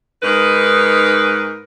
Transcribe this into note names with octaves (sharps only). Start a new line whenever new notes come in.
G#2 D#4 A#4 B4